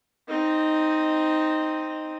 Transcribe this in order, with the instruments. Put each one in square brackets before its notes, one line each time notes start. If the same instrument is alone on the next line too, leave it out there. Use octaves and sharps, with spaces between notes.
[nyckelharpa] C4 D#4